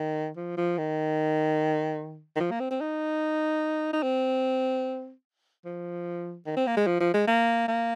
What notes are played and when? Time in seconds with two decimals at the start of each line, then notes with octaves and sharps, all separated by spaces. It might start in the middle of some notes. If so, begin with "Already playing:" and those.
Already playing: D#3
0.37 F3
0.57 F3
0.78 D#3
2.36 D#3
2.40 F3
2.51 A#3
2.60 C4
2.71 C4
2.81 D#4
3.93 D#4
4.03 C4
5.65 F3
6.46 D#3
6.57 C4
6.67 A#3
6.77 G#3
6.87 F3
7.00 F3
7.14 G#3
7.27 A#3
7.68 A#3